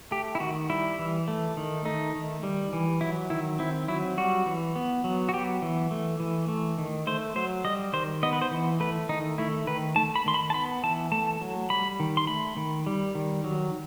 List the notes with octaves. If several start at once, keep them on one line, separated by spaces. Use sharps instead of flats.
A3 G4
E4
D#3 F#4
G3 E4
E3
A3
D#3
A3 D#4
D#3
G3
E3
F#3 E4
D#3 E4
C4 E4
F#3 E4
G3 F#4
E3
B3
F#3
F#4
B3 G4
E3
A3
E3
A3
D#3
A3 C5
F#3 C5
G3 D#5
D#3 C5
B3 D#5
B4
C5
E3
A3 B4
D#3 D#4
A3 E4
D#3 B4
A3 A5
B5
D#3 C6
B5
A5
B3 B5
E3 A5
A3 A5
F#3
G3 B5
D#3
C6
A3 B5
D#3
G3
D#3
F#3